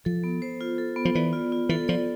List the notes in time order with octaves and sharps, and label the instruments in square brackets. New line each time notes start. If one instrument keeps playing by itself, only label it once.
[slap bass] F3 [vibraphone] A4
[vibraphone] B3
C5
F4
A4
B3
[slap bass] F3
[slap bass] E3 [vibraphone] D5
[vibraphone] F4
F4
[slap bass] E3 [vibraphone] A4
[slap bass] F3 [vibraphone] D5